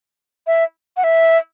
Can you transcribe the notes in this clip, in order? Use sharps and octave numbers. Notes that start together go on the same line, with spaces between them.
E5
F#5
E5